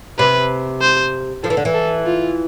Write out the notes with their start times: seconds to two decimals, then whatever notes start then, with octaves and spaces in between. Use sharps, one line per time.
0.19 C3 B4
0.81 C5
1.43 F3 A4
1.50 E3
1.57 D3
1.65 E3
1.74 A4
2.06 F4